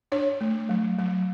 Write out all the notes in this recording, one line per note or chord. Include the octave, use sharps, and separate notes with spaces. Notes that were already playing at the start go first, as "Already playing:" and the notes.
D4 C#5
A3
F#3
F#3